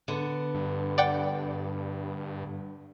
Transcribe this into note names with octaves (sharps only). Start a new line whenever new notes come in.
D3 B3
G2
D5 F#5 G5